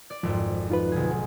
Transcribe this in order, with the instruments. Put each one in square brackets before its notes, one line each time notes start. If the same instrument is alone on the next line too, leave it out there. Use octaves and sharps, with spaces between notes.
[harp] D5
[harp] G#1 F2 [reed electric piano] F3
[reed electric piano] D#4 F4 B4
[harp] B1 D3 G#4